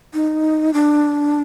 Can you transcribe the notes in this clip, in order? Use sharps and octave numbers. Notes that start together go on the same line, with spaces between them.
D#4
D4